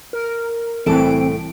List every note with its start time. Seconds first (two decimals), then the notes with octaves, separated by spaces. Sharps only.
0.13 A#4
0.86 C2 A2 E3 C4 A4 A5 D7